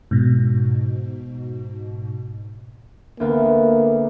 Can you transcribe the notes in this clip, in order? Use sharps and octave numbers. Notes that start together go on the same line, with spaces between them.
G#2 B2
D2 A#3 B3